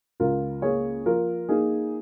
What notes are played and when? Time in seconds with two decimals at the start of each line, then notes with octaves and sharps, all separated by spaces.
0.20 C#2 F4 A#4
0.62 A#3 G#4 C#5
1.06 F3 F4 A#4
1.49 A#3 D#4 G#4